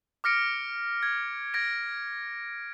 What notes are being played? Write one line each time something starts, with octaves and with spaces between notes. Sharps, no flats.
D6 F6 A#6 C#7 D7
G#6
G#6 A#6 D7